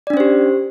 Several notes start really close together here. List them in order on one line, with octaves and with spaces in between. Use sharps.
D5 D4 C#4 C5 G4